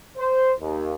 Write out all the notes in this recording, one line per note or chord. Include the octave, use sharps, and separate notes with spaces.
C5
D#2